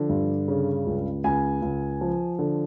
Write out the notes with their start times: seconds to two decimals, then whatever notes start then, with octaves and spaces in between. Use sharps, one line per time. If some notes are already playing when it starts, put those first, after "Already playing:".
Already playing: D3 F3
0.09 G2
0.48 C#3
0.86 C#2
1.24 C#2 G#5
1.62 C#2
2.01 F3
2.39 D3